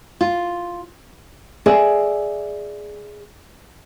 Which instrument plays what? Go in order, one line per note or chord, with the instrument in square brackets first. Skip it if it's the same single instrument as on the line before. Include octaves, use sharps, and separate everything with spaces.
[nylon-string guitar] F4
G#4 D5 E5